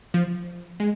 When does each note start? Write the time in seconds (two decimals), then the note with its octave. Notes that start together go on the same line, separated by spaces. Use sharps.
0.14 F3
0.80 G#3